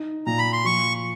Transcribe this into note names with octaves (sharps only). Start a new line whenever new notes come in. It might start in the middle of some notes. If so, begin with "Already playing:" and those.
Already playing: D#4
A#2 A#5
B5
C6
F3 C#6